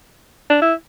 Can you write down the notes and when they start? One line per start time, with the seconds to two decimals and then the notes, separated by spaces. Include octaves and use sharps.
0.50 D4
0.62 E4